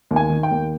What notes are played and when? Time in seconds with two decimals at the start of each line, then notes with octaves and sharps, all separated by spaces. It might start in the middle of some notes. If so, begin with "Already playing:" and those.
0.11 D#2
0.16 G#5
0.30 D#3
0.43 G5
0.51 D#2